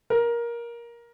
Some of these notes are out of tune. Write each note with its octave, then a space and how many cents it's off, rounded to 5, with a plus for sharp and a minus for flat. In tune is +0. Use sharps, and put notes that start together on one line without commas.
A#4 +15